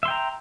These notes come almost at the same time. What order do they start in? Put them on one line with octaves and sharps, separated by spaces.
E5 C6 G5 A#5